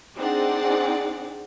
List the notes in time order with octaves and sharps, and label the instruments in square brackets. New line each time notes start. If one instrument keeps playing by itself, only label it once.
[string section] C4 D4 D#4 G#4 D5 F#5